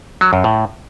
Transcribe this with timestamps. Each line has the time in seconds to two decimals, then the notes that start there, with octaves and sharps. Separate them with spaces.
0.21 F#3
0.33 F#2
0.44 A2